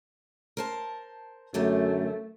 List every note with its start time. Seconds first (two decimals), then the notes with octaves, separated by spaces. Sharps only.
0.57 A#4 C5 A5
1.54 F#2 D3 F#3 A3 G4